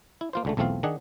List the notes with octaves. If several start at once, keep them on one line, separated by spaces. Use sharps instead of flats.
E4
A#3 F4 C5
C#2 D3 A3
B1 E2 A3 C4 F4 F5
D#3 D4 G#4 F#5